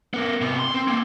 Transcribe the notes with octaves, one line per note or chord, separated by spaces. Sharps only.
B3 A#4
C3 B3
C6
C4
A#3 C4